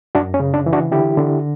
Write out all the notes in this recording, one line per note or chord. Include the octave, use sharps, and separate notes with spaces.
F#2 D4 F#4
C#4
C#3
D4
E3
D4 F#4
D3 E4 G4
D3